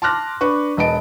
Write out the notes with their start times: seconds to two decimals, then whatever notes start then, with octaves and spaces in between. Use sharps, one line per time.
0.02 A5 C6 D6 F6 F#6 A#6
0.41 D4 B4 C#6
0.77 E1 B4 D#5 A5 D7